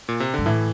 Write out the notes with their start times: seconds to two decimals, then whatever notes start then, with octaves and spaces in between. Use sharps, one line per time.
0.09 A#2
0.20 C3
0.34 G2 D3
0.45 A2 E3